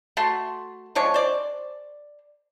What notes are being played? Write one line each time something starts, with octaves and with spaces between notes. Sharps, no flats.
A3 F#4 A5 C6
F3 G#3 D4 C#5
C5 D5